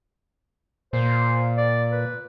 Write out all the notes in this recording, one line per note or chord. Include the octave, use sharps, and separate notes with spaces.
A#2 C5
D5
B4